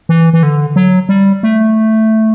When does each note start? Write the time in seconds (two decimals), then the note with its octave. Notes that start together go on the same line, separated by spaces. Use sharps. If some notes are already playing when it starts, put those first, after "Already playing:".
0.09 E3
0.33 E3
0.43 D3
0.76 F#3
1.09 G3
1.43 A3